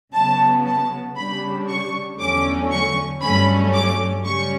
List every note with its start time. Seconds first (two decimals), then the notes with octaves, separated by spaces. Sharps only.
0.14 C#3 F#3 B3 A5
0.66 A5
1.17 C#3 G3 D4 B5
1.68 C#6
2.20 E2 D3 F#3 A3 C#4 D6
2.72 C#6
3.23 G2 F#3 A3 C#4 B5
3.74 D6
4.25 C#3 G3 C#4 C#6